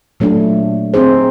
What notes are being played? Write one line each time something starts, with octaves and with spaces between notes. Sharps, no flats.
A#2 F#3 A3 D4
C4 D#4 G#4 C5